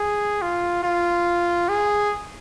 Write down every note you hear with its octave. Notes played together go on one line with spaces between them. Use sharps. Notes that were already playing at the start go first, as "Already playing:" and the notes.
Already playing: G#4
F4
F4
G#4